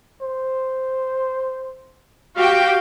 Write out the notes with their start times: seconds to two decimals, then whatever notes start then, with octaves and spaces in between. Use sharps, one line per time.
0.22 C5
2.37 F#4 G4 F5 G5